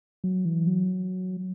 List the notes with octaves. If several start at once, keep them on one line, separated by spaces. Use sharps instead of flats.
F#3
E3
F#3